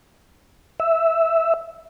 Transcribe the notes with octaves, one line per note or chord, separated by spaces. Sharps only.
E5